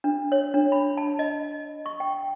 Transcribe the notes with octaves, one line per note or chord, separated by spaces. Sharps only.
D4
C#5
D4
B5
A5
D#5
C#6
G5